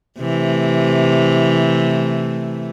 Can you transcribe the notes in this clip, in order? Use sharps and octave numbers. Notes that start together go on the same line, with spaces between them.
C3 E3 A3